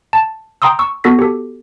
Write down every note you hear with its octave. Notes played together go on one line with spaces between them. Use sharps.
A5
G5 A#5 C6 D#6 E6
C#6 E6
B3 F#4 A4 A#6 B6
G4 A4